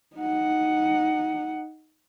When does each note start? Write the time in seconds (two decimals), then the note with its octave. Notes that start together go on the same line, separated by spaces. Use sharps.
0.17 D#4 F#5